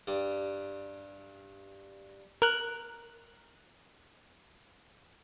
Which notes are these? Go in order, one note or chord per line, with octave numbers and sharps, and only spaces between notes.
G2 G3
A#4 F#6